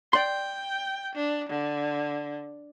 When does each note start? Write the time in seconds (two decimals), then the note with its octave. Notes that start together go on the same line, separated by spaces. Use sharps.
0.13 D5 G5 C6
1.15 D4
1.49 D3